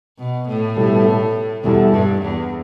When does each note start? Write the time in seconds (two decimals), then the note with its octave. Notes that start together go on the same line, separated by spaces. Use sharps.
0.19 B2
0.48 A2
0.77 B2 G3 E4 A4
1.64 E2 B2 G3 E4 A4
1.92 G2
2.21 E2